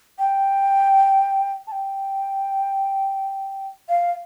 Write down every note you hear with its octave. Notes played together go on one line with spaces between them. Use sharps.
G5
A5
G5
F5